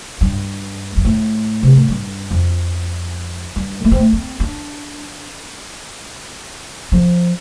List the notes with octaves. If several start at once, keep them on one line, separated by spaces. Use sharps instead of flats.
G2
G2
A2
C3
A2
G2
F2
G2
A3
C4
A3
C4
D4
F3